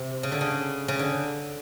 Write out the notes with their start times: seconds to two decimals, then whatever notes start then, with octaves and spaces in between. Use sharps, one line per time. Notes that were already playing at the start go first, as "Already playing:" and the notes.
Already playing: C3
0.23 C#3
0.32 D3
0.41 C#3
0.88 C#3
0.99 D3